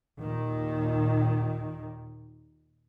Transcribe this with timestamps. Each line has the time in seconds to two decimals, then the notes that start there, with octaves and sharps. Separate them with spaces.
0.21 D#2 A#2 D#3